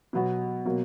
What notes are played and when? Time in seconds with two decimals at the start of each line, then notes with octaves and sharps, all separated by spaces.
0.13 B2 F#3 B3 F#4
0.66 B2 F#3 A#3